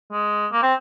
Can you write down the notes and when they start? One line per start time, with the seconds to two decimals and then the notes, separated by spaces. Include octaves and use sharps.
0.11 G#3
0.52 A#3
0.62 C4